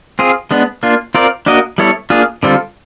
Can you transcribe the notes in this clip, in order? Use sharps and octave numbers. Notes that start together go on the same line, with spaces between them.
C4 F4 G#4
G#3 B3 D4
A#3 D4 F4
C4 F4 A#4 D5
A#3 D4 F#4 A#4 D#5
G3 B3 E4 A4 C#5
A#3 D4 F4 G#4
D3 G3 C4 F4 A4